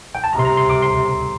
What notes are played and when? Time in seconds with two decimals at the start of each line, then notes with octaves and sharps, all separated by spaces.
0.15 G5
0.24 A5
0.33 C3 A#5
0.39 C6
0.45 A#5
0.57 C6
0.70 D6
0.82 C6